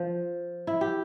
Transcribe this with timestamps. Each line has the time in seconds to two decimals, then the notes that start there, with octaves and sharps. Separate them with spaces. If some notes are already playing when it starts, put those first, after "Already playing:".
Already playing: F3
0.67 E4
0.81 G4